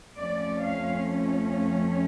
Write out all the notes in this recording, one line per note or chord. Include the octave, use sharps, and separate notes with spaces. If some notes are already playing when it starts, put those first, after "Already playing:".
F2 F3 A3 C#4 D5
F5